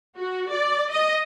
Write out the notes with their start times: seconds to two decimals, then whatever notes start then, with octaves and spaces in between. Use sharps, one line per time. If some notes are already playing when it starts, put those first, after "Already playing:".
0.18 F#4
0.51 D5
0.91 D#5